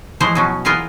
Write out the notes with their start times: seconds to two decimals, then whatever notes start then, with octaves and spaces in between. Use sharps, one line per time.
0.20 E3 F3 G#3 E4 C5 C#5
0.35 B2 F#3 C#4
0.65 E3 F4 G#4 A#4 B4 F5